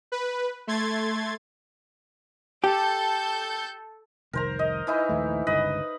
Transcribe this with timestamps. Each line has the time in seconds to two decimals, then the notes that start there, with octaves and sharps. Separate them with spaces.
0.12 B4
0.67 A3 C6 G#6 A6
2.64 G4 A4 G6
4.33 F1 C2 D#3 A#4 C5 A#5
4.59 D#5
4.87 E3 D#4 E4
5.09 A#1 D#2 A3
5.47 G1 C#2 G2 B4 D#5